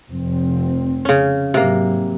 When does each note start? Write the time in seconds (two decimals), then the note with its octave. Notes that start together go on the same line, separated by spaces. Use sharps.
0.11 F1 C4
1.05 C#3 C#4
1.54 G#2 C3 F#3 A#3